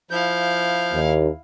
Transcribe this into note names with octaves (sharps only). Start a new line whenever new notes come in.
F3 E4 F5 G6
D#2